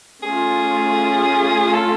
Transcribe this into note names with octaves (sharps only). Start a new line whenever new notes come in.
A3 C#4 F4 G#4
A4